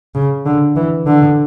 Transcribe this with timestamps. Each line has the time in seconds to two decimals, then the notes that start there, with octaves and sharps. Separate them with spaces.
0.15 C#3
0.46 D3
0.76 E3
1.06 D3